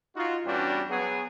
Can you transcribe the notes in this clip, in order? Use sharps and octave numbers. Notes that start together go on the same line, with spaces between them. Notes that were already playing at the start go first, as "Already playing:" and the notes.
D#4 F4 F#4
E2 G2 G3 C#4 D4 F#4
F#3 B3 G#4